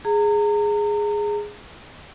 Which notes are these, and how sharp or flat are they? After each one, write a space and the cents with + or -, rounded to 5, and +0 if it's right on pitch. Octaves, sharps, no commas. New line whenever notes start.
G#4 +0 A#5 -35